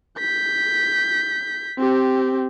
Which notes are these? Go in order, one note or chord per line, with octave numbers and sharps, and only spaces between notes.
G6 B6
C4 G4